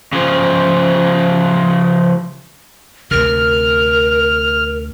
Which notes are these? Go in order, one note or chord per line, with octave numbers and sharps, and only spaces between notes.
C#3 F3
D2 C3 A#4 F6